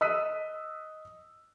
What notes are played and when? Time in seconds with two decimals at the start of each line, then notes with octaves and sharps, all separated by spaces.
0.01 D#5 D#6 E6 F#6 B6 D#7